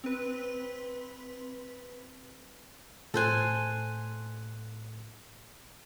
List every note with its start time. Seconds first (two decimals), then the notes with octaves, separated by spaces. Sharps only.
0.04 C4 B4
3.14 A2 A4 C5 G#5 F#6